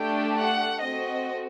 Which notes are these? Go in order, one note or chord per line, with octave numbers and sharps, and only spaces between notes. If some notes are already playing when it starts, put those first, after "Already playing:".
Already playing: A3 D4 G4 G5
F#5
C4 F#4 A4 D#5